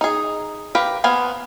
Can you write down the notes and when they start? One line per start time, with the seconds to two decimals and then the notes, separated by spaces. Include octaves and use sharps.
0.01 D#4 G#4
0.75 G4 A#4 B4 F5 G5
1.04 A#3 B3 C5 F5 G#5